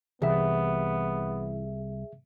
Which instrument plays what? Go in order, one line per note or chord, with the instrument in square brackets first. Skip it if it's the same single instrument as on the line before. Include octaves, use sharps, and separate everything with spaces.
[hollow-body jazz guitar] C2 [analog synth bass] E3 [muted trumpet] B3 [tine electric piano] G#4 E5